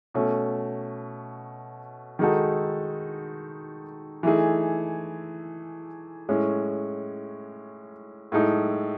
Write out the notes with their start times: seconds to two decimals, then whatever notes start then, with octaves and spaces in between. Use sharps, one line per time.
0.14 B2 A3 C#4
2.19 D#3 G#3 D#4 F#4 A4
4.23 E3 A3 D#4 G#4
6.29 A2 G#3 C#4
8.32 A2 G#3 D#4 A4